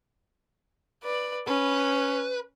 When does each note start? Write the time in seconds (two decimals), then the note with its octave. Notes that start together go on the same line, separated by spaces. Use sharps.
1.03 B4 D5
1.48 C#4 B4